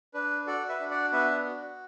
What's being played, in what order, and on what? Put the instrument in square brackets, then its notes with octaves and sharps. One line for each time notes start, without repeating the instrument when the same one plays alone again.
[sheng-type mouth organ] D4 B4
F#4 A4 D5
B4 E5
D4
D5 F#5
B3 B4 E5
F#4